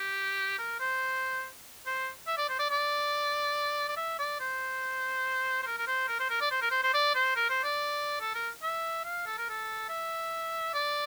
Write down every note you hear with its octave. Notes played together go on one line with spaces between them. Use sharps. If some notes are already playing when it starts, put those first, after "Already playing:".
Already playing: G4
A#4
C5
C5
E5
D5
C5
D5
D5
D5
E5
D5
C5
C5
A#4
A#4
C5
A#4
C5
A#4
D5
C5
A#4
C5
C5
D5
C5
A#4
C5
D5
A4
A#4
E5
F5
A4
A#4
A4
E5
D5